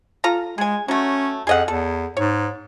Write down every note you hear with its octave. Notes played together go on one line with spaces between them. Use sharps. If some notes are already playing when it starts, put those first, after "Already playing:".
F4 A4 A#5
G#3 G#4 G#5
F#3 A3 C#4
F2 G#4 D#5 F#5
E2 A4
G#2 C#5